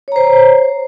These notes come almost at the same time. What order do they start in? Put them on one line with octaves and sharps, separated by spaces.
C#5 A#5 C5